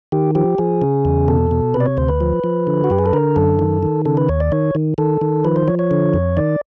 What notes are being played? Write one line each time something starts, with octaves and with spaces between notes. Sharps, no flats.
D#3 G4
F3 G4
F3 G#4
C#3
E2
B2 A4
B2
C3 B4
D5
C#5
D2 C5
B4
F3
F3
D3
F#4
F#2 G4
G#4
A4
D3 A#4
F#2 A4
D#3
D#3
C#3 A4
B4
D#2 C#5
D5
D#3 C#5
D#3
D#3 A4
D#3
F3 B4
C5
F3 C#5
C#5
D3
F2
D#3 D5